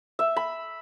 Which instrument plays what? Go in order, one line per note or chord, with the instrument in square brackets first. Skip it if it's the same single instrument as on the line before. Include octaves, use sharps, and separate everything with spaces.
[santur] E5
B5